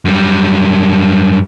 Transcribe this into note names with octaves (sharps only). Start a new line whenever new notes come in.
F#2 G3